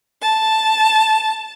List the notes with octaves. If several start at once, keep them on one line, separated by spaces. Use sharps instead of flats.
A5